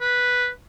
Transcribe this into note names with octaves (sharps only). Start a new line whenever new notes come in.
B4